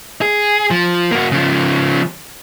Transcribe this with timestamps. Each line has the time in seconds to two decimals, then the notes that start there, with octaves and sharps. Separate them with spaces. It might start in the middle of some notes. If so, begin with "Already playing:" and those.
0.21 G#4
0.71 F3
1.11 A#3 F#4
1.32 C#3 F3